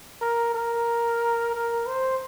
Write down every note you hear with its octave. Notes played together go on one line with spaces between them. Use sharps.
A#4
A#4
A#4
C5